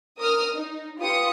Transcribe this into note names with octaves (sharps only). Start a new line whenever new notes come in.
A#4 D#6 F6
D#4
F4 G4 B4 D#6 C#7